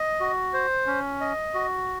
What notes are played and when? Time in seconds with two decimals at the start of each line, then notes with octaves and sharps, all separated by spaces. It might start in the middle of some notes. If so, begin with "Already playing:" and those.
Already playing: D#5
0.20 F#4
0.54 C5
0.87 C#4
1.20 D#5
1.54 F#4